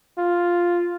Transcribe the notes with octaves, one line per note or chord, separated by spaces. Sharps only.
F4